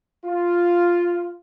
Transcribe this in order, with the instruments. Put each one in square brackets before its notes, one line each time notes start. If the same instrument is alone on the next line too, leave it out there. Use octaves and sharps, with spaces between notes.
[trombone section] F4